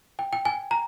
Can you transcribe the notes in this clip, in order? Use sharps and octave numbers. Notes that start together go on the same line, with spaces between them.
G5
G5
G#5
A#5